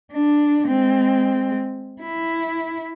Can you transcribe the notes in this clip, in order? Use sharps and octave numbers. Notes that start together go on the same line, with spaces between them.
D4
G#3 C4
E4